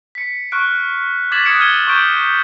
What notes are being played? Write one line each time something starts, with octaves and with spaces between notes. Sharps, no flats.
B6 C#7
C#6 F6 F#6 D7
D6 G#6 A6 B6 E7 F#7
D#6 F#6 G#6 C#7 D7 E7
F6 G#6 D#7 G7
C#6 D6 G6 D7 F#7